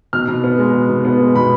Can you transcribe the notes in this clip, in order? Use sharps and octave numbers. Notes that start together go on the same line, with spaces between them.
B2 F6
B2
B3
G#3
B2
B2
B3
G#3
B2 B5